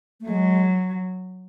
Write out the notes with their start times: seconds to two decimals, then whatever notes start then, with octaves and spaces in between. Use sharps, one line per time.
0.21 A3
0.29 F#3 G#3